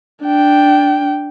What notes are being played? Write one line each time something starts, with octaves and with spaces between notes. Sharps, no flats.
D4 G5